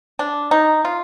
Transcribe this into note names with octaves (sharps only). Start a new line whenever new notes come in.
D4
D#4
F4